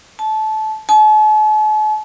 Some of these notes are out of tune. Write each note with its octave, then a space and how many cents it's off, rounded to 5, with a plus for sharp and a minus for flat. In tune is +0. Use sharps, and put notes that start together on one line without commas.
A5 -20
A5 -45